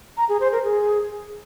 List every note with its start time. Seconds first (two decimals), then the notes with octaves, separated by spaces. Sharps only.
0.17 A#5
0.29 G#4
0.40 C5
0.52 A#4
0.63 G#4